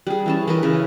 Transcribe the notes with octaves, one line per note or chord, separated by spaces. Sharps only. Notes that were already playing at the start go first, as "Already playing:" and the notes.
G3 G#4
E3 C#4 A5
E3 A#4 B4 D#5
C#3 E3